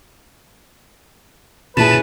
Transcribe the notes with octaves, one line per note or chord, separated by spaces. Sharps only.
A#2 C#4 E4 G#4 B4 A5